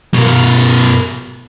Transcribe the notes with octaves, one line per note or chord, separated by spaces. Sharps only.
B2 A#4